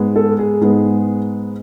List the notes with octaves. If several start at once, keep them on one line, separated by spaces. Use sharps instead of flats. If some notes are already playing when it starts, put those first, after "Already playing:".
Already playing: G#2 G#3 B3
A4
G#4
G#2 G#3 B3